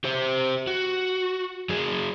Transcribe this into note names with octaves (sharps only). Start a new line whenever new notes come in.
G4 C5
F#4
F#3 G#4